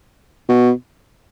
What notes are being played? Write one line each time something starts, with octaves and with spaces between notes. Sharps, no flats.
B2